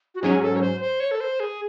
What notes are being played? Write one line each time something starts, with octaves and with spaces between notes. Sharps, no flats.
F#4
G#2 F#3 C#4 G#4
A4
C#5
C5
C5
C#5
A4
C5
G#4